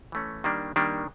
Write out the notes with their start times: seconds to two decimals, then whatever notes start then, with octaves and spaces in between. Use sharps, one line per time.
0.12 E3 A3 C#4
0.44 D#3 G3 A#3 D4
0.76 D#3 G3 A#3 D4